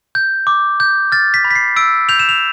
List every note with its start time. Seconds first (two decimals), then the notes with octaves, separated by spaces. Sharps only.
0.15 G6
0.47 D6
0.80 G6
1.12 F6 A6
1.34 B6
1.45 B5
1.51 B6
1.55 C7
1.76 E6 D7
2.09 G6 F7
2.19 E7
2.29 F7